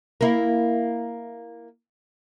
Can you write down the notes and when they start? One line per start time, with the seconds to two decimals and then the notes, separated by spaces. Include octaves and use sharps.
0.21 A#3 E4